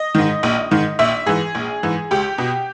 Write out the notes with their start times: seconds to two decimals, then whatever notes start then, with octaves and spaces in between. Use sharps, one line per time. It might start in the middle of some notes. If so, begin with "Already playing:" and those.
Already playing: D#5
0.15 G#2 D#3
0.43 A#1
0.71 G#2 D#3
0.99 A#1 E5
1.26 G#2 E3 G#4
1.55 A#1
1.83 G#2 E3
2.11 C#2 G4
2.38 B2